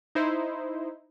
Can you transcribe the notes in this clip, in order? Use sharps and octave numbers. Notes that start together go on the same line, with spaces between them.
D#4 E4 C5